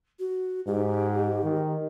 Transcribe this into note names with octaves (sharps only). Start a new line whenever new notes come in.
F#4
G#2 G4
D#3